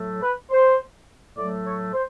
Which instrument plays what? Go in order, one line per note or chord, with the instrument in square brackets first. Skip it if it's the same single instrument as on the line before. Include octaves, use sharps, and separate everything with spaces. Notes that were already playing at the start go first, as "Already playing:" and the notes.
Already playing: [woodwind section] A2 F#3 A3
B4
C5
A2 F#3 A3 D5
C#5
C5